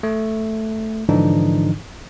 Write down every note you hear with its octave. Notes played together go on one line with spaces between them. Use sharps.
A3
G#2 D3 E3 F3 D4 D#4